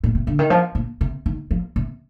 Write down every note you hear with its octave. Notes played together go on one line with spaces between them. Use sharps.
A#2
C3
D3
D#3
F3
A#2
C3
D#3
F3
C3